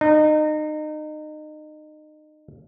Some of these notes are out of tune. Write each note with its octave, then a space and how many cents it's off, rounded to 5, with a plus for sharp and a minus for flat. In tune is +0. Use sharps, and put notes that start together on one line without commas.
D#4 -30